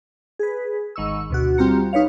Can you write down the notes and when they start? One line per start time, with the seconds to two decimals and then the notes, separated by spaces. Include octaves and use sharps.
0.39 G#4 B4
0.96 G#1 D#3 C#6 E6
1.30 D2 B2 F#4
1.58 G3 C4 F4 G4 A#5 C#7
1.93 D#4 B4 C#5 F5